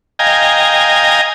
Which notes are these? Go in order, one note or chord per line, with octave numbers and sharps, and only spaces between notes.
D#5 F5 G5 G#5 A#5